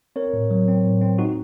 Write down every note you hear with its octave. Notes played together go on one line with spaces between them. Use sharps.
C4 A#4 C#5
A2
F#3
C4
A2
C4
D#4 F#4